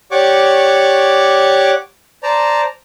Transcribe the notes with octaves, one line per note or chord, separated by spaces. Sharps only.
G4 C#5 D5 F#5 C#6 D6
C5 D5 A5 A#5